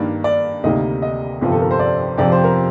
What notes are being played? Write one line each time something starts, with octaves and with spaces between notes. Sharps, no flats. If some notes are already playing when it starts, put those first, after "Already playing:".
Already playing: G2 D#3 A#3 D5
D5
D2 C3 D#3 G3 A#3 D#5
D#5
G1 F2 C3 F3
A4
A#4
C5
D5
F2 C3 F3 D5
C5
A#4